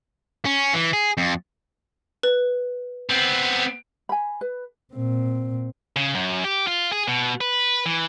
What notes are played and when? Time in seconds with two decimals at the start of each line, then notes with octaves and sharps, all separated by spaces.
0.45 C#4
0.74 E3
0.93 G#4
1.17 F2
2.23 B4
3.10 B3 C4
4.09 G#5 B5
4.41 B4
4.94 A#2 C4
5.96 C#3
6.15 F#2
6.44 G4
6.67 F4
6.92 G#4
7.08 B2
7.41 B4
7.86 E3